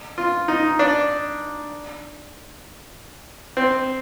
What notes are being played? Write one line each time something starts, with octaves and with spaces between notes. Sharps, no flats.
F4
D#4
D4
C4